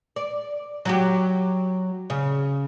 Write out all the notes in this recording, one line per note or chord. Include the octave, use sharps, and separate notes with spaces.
D5
F#3 F#4 G4
C#3